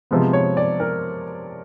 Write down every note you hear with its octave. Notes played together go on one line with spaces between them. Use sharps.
C3 F3 G#3 B3
C#5
D5
A#4